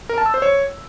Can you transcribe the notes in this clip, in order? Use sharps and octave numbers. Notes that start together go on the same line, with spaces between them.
A#4
A5
E6
C5
C#5